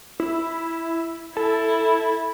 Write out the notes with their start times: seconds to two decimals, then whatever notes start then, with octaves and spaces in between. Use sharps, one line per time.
0.20 E4
1.37 E4 A4